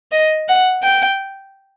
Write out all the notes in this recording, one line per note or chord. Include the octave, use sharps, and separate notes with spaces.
D#5
F#5
G5